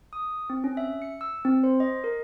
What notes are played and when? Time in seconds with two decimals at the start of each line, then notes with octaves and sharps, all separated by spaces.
0.13 D#6
0.50 C4
0.64 C#4
0.77 E5
1.02 C#7
1.21 E6
1.45 C4
1.64 C5
1.80 D#5
2.04 A#4